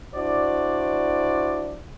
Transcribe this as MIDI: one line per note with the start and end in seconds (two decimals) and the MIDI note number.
0.15 1.79 62
0.15 1.79 64
0.15 1.79 66
0.15 1.79 72
0.15 1.79 74